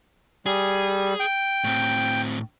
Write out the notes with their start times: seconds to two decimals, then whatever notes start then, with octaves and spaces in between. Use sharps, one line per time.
0.46 G3 G#4
1.20 G5
1.64 A2 C4